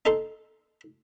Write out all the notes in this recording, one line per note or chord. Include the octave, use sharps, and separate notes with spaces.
D#4 A4 C6